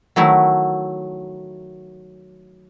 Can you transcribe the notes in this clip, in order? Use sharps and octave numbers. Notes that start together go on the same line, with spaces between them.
D#3 F#3 A3 E4